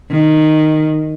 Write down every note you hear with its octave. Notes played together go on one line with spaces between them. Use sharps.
D#3